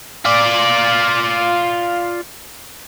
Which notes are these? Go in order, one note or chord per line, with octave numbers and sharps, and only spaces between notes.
F4 D5